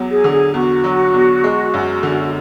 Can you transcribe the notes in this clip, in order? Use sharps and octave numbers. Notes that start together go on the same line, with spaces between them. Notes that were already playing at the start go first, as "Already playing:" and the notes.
Already playing: E2 F#3
G#4
D3
G#4
E2 F#4
F#3
E2
G#3
F#2
D3